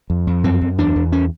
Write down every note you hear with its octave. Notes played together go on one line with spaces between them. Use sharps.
F2
F2
F#2 C4
F#2
E2 D4
E2
C#4